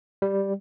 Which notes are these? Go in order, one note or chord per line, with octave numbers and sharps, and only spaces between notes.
G3